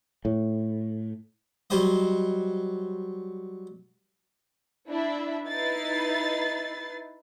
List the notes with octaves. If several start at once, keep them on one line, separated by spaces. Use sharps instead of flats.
A2
F#3 G3 C5 D#5
D4 E4 E5
D#4 E4 B4 A6 C7